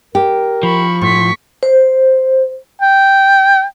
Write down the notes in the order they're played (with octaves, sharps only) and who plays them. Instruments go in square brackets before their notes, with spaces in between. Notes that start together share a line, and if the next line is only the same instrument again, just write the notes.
[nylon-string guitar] G4 [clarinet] A#4
[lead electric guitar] F3 [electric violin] B5 C#6
[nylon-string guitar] A2 [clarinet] C6 [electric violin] C#6 B6
[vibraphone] C5
[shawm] G5